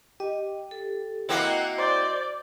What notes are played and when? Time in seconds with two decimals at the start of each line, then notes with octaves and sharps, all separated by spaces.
0.20 G4 D#5
0.71 A4
1.29 A#3 C4 E4 F#4 D#5 F#5
1.78 C5 D5 G6